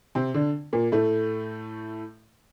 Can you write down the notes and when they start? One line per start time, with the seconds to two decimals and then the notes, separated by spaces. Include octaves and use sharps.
0.15 C3 C4
0.34 D3 D4
0.73 A#2 A#3
0.92 A2 A3